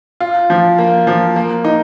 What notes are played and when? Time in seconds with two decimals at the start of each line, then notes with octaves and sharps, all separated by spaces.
0.20 F4
0.50 F3
0.78 A#3
1.07 F3
1.36 A#3
1.64 D#4